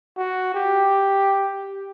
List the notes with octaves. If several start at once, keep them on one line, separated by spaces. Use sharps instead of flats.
F#4
G4